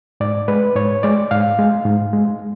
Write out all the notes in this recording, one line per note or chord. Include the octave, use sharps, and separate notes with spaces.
G#2 D5
G#3 B4
G#2 C#5
G#3 D5
G#2 F5
G#3
G#2
G#3